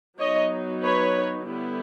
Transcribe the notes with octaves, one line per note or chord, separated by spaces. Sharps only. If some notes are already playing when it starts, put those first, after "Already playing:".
F#3 B3 D#4 C#5 D#5
B4 C#5
D3 G3 B3 E4